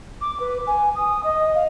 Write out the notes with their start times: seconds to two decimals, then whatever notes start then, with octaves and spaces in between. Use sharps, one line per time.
0.21 D6
0.40 B4
0.67 G#5
0.95 D#6
1.23 D#5
1.55 F5